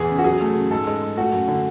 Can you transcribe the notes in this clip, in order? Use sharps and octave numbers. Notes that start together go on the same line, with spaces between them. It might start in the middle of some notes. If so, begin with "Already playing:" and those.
Already playing: E2 E3 G#4
C#3
F#4
F#3 G#4
A3
C#3
G#2 A4
G#3
G#3
A3 F#4
F#2
D3